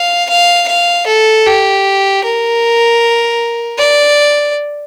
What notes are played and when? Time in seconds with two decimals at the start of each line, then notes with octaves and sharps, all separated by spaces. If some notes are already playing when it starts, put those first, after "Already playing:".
Already playing: F5
0.29 F5
0.68 F5
1.06 A4
1.46 G4
2.24 A#4
3.79 D5